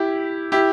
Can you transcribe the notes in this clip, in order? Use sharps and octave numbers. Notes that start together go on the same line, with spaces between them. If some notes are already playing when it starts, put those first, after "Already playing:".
Already playing: E4 G4
E4 G4